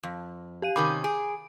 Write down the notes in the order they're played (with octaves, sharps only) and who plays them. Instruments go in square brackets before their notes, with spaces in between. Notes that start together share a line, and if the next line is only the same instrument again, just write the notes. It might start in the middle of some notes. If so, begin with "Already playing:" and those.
[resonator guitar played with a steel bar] F2
[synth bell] G4 F5 D#7
[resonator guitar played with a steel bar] C3 D#3 C#4 [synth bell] B5 D6 G6
[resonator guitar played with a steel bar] G#4 [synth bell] D7